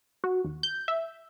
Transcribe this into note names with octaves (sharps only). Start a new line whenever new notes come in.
F#4
D#2
G6
E5